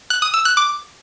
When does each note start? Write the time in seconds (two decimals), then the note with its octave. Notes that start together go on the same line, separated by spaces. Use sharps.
0.10 F#6
0.22 D#6
0.34 E6
0.45 F#6
0.57 D6